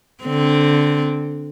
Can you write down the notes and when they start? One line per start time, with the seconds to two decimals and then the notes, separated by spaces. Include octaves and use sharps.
0.24 D3 C4